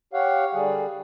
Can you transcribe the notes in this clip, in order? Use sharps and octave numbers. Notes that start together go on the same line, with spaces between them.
G4 C#5 F5 F#5
D3 G3 G#4